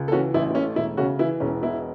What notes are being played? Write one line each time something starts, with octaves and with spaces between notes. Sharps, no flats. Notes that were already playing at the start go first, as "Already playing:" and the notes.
Already playing: C#2
A4
E3 C#4 F#4
A1 E4
E4
A3 C#4
E1 E4
C#3 C#4 F#4
E3 E4
E1 C#4
B2 E4